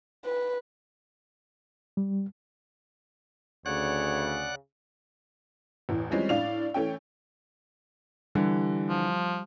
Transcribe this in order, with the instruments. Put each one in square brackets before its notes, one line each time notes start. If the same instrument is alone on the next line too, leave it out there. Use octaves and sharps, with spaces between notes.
[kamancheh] B4
[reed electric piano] G3
[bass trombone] D2 [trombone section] C#3 [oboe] C#5 [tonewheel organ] D5 F#5 F#6
[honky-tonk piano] A1 E2
E3 F3 G3 G#3 C4 C#4
A2 D4 D5 F5 F7
E3 A3 C#4 G5
[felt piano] D3 E3 [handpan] G3
[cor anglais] F3